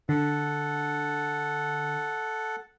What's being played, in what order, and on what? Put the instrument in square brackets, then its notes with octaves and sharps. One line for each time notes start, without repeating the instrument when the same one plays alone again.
[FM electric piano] D3 [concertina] A4 F#5